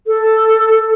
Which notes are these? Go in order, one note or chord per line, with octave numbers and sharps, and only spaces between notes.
A4